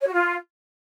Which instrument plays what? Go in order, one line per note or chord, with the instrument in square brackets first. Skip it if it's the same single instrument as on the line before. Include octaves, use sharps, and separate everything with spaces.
[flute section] C#5
F#4
F4